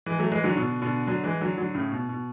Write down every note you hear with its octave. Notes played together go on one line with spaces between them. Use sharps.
E3 G#3
F#3 A3
E3 G#3
D3 F#3
B2 D3
B2 D3
D3 F#3
E3 G#3
D3 F#3
D3 F#3
A2 C#3
B2
B2